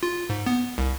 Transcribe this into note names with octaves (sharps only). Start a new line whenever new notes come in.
F4
G#2
B3
C2